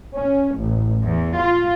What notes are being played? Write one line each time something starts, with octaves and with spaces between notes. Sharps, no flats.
C#4
A1
E2
F4